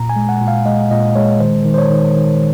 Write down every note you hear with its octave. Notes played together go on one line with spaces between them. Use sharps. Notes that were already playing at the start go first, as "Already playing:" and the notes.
Already playing: A#2 A#5
G#5
G#3
F#5
A#2
F5
G#3 D#5
A#2 D#5
G#3 C#5
D#3 C5
D#3
C5
C#5
D#3
D#3